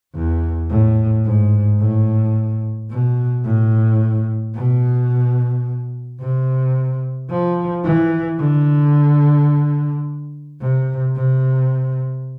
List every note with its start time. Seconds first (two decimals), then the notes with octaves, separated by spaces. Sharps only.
0.15 E2
0.70 A2
1.25 G#2
1.79 A2
2.90 B2
3.45 A2
4.55 B2
6.20 C3
7.30 F3
7.85 E3
8.40 D3
10.60 C3
11.15 C3